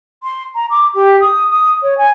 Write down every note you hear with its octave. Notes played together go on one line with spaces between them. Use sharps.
C6
A#5
D6
G4
D#6
D#6
C#5
G#5